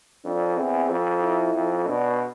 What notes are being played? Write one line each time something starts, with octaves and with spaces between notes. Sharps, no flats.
F2 D4
E2 C4
F2
E4
F2
B2 D4